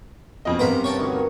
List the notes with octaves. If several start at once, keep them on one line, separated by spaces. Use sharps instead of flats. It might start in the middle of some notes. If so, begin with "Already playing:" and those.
F2 B2 C#4 D#5
G2 C3 B3 A#4 C5 A#5 B5
C#5 G5 A5
D2 D#3 C#5 C#6